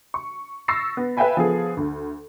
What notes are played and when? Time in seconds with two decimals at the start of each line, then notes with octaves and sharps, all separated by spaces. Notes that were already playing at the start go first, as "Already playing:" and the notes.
0.14 C#6
0.68 C#6 E6 A6 A#6 C7
0.97 B3
1.17 B4 E5 F5 G5 G#5 B5
1.37 F3 B3 G#4 A4
1.77 D2